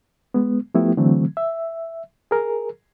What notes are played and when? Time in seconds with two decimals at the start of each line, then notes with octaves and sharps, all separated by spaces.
0.34 G#3 B3
0.74 F3 A3 B3 E4 G4
0.97 D3 E3 F#3 A3 C4
1.37 E5
2.31 G#4 A#4